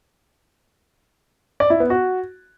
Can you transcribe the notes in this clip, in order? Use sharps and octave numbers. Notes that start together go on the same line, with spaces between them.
D5
E4
B3
F#4